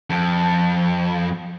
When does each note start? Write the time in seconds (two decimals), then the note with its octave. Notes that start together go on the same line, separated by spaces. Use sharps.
0.10 F2